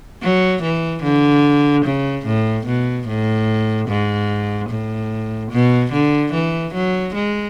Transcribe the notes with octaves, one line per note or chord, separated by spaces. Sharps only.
F#3
E3
D3
C#3
A2
B2
A2
G#2
A2
B2
D3
E3
F#3
G#3